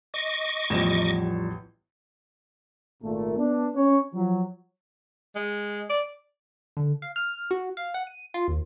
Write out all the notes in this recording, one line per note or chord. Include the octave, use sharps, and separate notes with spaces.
D#5 C#6 D6
A1 E2 F3 G3 E7
G#1 A#2 A3
B3 D4
C#4 C#5
F3 F#3
G#3
D5
D3
F5
F6
F#4
F5
F#5
D#7
F4
D#2